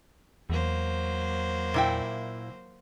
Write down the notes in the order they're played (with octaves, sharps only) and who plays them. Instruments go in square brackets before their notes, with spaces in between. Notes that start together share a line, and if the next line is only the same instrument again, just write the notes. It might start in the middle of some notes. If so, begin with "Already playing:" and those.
[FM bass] E2 [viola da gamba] F#3 A#3 C5
[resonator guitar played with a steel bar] A#2 E4 G5